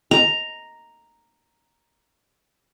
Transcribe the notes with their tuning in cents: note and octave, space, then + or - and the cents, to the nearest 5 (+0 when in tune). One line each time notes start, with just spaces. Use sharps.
A#5 +0